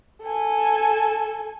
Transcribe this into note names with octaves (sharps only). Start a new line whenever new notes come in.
A4 G#5